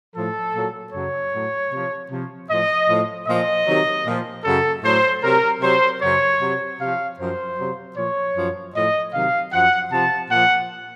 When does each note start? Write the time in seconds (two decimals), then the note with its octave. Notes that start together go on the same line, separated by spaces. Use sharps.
0.14 A2 F3 A4
0.53 A#2 F#3
0.93 F#2 C#3 F#3 C#5
1.32 A2 F#3
1.71 C3 F3
2.10 C3 F3
2.49 A2 F3 D#5
2.88 A2 F3
3.27 A#2 F3 D#5
3.66 C3 D#3 F#3
4.05 A#2 F3
4.44 F#2 C#3 F#3 A4
4.83 A2 F#3 C5
5.22 C3 F#3 A#4
5.62 C3 F#3 C5
6.00 F#2 C#3 F#3 C#5
6.40 C3 F#3
6.79 C3 F3 F5
7.18 F#2 F3 C5
7.57 C3 F#3
7.96 A#2 F3 C#5
8.35 F#2 F3
8.74 A2 F3 D#5
9.13 C3 D#3 F#3 F5
9.52 F#2 F3 F#5
9.91 C3 F3 A5
10.30 A#2 F3 F#5